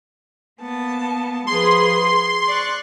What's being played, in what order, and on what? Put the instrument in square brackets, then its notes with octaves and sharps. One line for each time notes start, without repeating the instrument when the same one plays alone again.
[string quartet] A#3 B3 A5
[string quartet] F3 G#4 B4 [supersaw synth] C6
[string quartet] G#4
D5 C#6 F#6